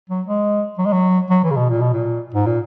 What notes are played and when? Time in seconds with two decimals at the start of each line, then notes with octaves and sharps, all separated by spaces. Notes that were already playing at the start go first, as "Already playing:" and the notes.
0.10 F#3
0.27 G#3
0.78 F#3
0.86 G#3
0.93 F#3
1.30 F#3
1.43 E3
1.51 C#3
1.56 B2
1.70 A#2
1.82 B2
1.93 A#2
2.34 G#2
2.46 A#2